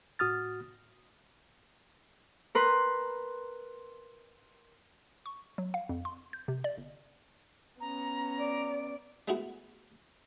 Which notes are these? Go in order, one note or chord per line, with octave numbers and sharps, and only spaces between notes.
A2 F#4 D#6 F6 A6
A#4 B4 C6
C#6
F#3
F5
F2
C6
G6
C3
D5
G1
B3 C#4 A#5
D5
G#3 A3 B3 D#4 E4 F#4